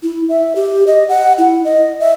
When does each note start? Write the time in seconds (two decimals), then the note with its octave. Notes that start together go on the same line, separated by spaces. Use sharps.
0.03 E4
0.29 E5
0.56 G4
0.87 D#5
1.09 F#5
1.38 E4
1.65 D#5
2.00 E5